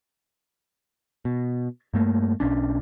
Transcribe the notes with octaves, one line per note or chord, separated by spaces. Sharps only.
B2
G2 A3 A#3
B1 C#4 D4